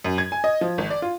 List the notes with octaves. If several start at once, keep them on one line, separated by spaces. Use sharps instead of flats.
F#2
G#6
G#5
D#5
F3
G#1
D5
F4